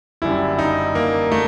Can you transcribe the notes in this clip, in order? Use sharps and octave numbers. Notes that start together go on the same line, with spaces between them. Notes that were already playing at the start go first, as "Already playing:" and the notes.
F#1 F#2 D3 G3 E4
D#4
A#3
A3